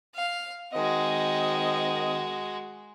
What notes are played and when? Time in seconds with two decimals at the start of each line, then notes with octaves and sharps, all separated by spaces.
0.15 F5
0.73 D#3 G#3 C4 F#4 D#5